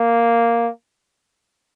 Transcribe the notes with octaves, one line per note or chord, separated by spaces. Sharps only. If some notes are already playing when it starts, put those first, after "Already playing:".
Already playing: A#3